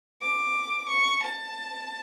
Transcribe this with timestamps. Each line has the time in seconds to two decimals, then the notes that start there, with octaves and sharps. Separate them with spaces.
0.22 D6
0.89 C#6
1.23 A5